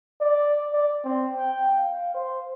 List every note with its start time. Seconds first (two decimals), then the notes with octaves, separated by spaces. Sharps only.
0.21 D5
0.73 D5
1.04 C4
1.37 G5
1.77 F5
2.14 C5